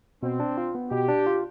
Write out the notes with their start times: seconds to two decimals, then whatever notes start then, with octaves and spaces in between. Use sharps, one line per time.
0.23 B2 C4
0.40 D4
0.57 F4
0.75 B3
0.91 B2 G4
1.09 D4
1.27 F4